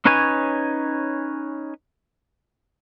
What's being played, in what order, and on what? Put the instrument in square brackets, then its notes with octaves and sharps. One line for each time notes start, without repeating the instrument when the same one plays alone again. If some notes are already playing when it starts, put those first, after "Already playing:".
[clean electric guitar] C#4 D#4 B4 C#5 G#5